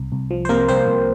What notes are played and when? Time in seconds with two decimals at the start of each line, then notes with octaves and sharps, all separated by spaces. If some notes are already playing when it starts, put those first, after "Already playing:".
Already playing: C2
0.12 C2
0.31 F3
0.45 C5
0.49 C3 A#3 A#4
0.68 C2 C4 C5
0.87 C2